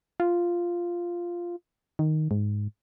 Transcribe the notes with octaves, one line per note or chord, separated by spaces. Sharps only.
F4
D#3
G#2